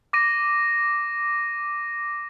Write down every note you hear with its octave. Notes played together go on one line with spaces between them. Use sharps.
D6 A#6 D#7